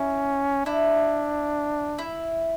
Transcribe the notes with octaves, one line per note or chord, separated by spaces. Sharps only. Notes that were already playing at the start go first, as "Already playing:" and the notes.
Already playing: C#4 E4
D4 E4
E4